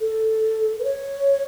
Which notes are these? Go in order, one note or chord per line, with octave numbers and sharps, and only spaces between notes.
A4
B4
C#5